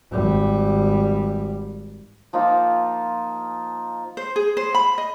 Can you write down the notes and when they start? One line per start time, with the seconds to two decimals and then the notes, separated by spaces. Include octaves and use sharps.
0.11 G#1 G3
2.33 F3 A#3 D#4 F4
4.17 C5
4.36 G#4
4.57 C5
4.75 B5
4.98 D#5